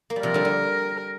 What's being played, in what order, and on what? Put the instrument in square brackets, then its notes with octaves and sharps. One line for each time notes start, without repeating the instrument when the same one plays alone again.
[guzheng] A#3
G3
[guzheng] C3 F3 [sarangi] A#4
[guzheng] D3 G3
D3